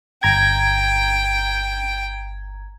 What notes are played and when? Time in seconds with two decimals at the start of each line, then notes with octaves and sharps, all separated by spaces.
0.23 G1 G5 A#5 G#6